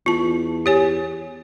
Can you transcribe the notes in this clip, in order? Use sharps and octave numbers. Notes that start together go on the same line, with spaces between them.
E2 F4 A5
G4 C#5 G#5